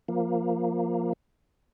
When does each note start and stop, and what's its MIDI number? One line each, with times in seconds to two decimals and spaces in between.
0.08 1.13 53
0.08 1.13 58